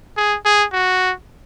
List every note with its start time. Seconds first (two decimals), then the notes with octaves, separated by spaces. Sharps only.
0.17 G#4
0.45 G#4
0.73 F#4